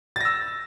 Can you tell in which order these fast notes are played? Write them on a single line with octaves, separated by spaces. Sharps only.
A6 A#6 E6